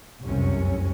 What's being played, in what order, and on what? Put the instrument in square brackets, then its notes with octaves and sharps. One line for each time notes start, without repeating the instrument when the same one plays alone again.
[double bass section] F1 C2 F#2 C3 C#4